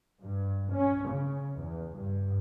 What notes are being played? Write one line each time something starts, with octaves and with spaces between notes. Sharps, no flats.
G2
C#4
C#3
E2
G2